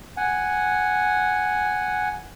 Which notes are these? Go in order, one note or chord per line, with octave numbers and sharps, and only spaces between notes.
F#5 G#5